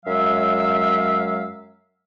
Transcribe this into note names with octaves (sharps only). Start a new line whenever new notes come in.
F#2 F#3 G#3 E5 F5 E6